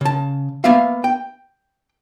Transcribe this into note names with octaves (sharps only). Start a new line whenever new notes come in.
C#3 A5
A#3 B3 E5 F5
G5